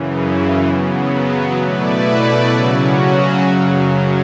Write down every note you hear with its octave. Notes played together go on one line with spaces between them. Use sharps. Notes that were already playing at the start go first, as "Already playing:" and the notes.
Already playing: F#2 C#3 E3
C#3 F#3 B3
B2 A3 E4 B4 D5
C#3 F#3 C#4 F#4
F#2 C#3 F#3